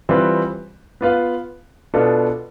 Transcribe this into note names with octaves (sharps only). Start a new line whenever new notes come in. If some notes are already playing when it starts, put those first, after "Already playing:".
E3 G3 C4 F4 B4
B3 F4 B4 F5
B2 B3 D4 F4 A4